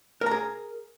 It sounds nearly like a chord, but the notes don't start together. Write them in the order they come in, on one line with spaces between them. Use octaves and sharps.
A#4 A#5 G#4